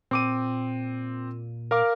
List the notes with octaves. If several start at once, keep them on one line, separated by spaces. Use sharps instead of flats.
A#2 C4 D6 D#7
A#4 F5 D6